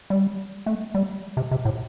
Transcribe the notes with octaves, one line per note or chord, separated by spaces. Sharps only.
G3
A3
G3
C3
C3
A2